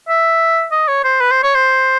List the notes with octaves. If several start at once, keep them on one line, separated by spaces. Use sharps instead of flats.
E5
D#5
C#5
C5
B4
C5
C#5
C5